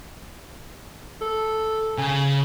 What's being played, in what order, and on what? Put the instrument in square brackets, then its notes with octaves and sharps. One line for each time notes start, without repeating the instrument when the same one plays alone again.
[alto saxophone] A4
[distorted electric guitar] C#3 [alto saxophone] G#5